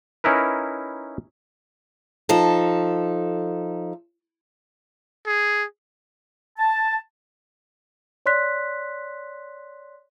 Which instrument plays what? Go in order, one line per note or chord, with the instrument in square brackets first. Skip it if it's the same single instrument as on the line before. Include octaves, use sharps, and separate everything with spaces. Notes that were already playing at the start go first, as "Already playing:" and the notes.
[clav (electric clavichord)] C#4 D#4 E4 A#4 B4
[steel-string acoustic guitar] F3 D#4 A4
[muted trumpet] G#4
[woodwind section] A5
[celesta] C#5 D5 C6 F#6 B6